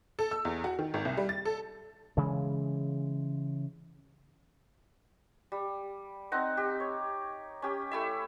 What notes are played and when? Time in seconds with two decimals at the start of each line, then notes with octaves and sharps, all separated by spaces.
0.19 A4
0.31 E6
0.45 E2
0.64 F#4
0.79 D#3
0.94 G#1
1.05 C2
1.17 G3
1.29 A6
1.45 A4
2.17 C#3 E3 G#3
5.52 G3
6.32 C4 D#4 F#5
6.57 G4
6.80 C#5
7.62 C#4 G4
7.91 A3 E4 E5